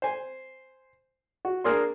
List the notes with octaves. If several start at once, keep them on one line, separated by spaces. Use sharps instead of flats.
C5 G#5
F#4
A#3 D4 G#4 A#4 D5 C6